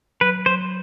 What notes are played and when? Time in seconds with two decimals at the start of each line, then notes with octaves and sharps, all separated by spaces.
0.21 F#3 B4
0.46 F#3 C5